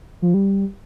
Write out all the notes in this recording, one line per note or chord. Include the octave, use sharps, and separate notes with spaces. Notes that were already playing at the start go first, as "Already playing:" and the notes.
F3
G3